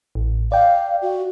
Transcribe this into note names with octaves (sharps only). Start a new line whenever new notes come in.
A1
D5 F5 G5
F#4